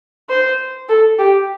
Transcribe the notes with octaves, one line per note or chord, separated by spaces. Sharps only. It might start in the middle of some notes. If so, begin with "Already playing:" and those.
C5
A4
G4